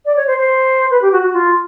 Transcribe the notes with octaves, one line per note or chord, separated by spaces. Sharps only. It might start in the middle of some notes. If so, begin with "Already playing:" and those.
D5
C#5
C5
C5
B4
G4
F#4
F#4
F4